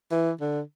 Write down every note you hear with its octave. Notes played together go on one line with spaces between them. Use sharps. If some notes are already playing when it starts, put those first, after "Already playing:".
E3
D3